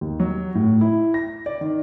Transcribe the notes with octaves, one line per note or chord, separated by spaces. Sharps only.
D#2
F#3
A2
E4
A#6
D5
D#3